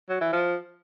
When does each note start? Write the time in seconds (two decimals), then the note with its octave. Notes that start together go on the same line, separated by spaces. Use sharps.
0.09 F#3
0.21 E3
0.33 F3